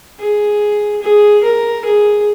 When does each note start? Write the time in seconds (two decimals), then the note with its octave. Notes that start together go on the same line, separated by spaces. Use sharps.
0.19 G#4
1.02 G#4
1.44 A#4
1.85 G#4